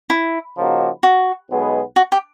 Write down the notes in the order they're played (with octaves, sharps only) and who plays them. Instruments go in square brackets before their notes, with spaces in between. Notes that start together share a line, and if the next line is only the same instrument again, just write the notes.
[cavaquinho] E4
[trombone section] C#3 F3 A#3 D#4 F#4
[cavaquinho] F#4
[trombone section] B1 B2 G#3 B3
[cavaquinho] F#4
G4